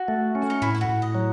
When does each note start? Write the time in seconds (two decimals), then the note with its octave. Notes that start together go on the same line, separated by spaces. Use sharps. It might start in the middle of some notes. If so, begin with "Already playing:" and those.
Already playing: F#4
0.08 A3
0.35 C#4
0.50 D#4
0.62 A2 E4
0.75 E4
0.81 F#4
0.89 A2
1.02 D#5
1.15 F#3